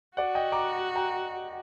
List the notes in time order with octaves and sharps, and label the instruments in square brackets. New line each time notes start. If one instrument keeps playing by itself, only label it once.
[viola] F#4 [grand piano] D5 F#5
[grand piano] D#5 G5
A#5 D6
G5 A#5